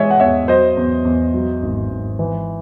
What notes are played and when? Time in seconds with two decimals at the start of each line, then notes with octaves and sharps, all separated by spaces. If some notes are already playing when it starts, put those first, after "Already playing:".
Already playing: E3 G#3 C#5 D#5 E5
0.10 F#5
0.20 E2 C#5 E5
0.48 F#3 C5 D#5
0.77 E2
1.05 E2
1.34 F#3
1.63 G#1
1.90 G#1
2.19 E3